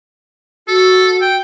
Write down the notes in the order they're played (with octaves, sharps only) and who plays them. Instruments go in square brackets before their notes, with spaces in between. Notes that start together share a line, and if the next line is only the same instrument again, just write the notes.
[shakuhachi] F#4 [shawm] A4
[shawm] G5